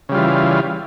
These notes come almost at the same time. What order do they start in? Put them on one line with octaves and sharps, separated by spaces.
C#3 G3 F4 E3